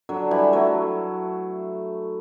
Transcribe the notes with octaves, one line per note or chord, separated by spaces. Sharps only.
D3 F#3
E3 G3
F#3 A3